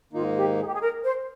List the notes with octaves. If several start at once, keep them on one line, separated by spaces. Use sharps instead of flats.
G#2 D#3 A#3 D#4 F4
G4
G#4
G4
G#4
A#4
C5